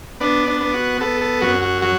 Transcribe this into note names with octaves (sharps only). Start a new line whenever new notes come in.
B3 D4
D4
B3
F#4
B3 A4
A4
F#2 F#4
F#4
F#3 F#4